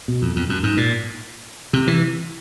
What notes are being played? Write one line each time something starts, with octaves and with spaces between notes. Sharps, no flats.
B2
F2
F2
F#2
G#2
A#2
C3
E3